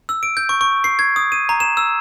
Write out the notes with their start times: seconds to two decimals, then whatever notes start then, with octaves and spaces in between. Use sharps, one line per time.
0.09 E6
0.23 D7
0.37 G6
0.49 C#6
0.61 C#6
0.84 C7
0.99 G#6
1.16 D#6
1.32 D#7
1.49 A#5
1.60 E7
1.77 E6